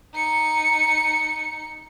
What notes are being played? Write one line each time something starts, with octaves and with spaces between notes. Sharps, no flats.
D#4 C#7